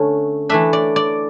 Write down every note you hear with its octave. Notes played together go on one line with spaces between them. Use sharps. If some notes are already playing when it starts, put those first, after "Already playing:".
Already playing: D3 A3 C#4
E3 A3 D4 E5
D5
D5